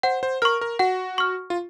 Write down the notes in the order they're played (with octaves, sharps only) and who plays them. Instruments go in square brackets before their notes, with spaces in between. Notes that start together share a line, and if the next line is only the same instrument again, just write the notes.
[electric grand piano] C5 [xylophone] F#5
[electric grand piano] C5
[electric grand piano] A#4 [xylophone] C#6 F6
[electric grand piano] A#4
[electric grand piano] F#4 [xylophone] F#5
[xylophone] C#6 F6
[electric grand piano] F4